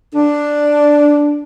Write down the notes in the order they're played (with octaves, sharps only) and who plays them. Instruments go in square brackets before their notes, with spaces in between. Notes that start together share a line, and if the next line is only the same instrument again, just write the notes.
[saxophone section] D4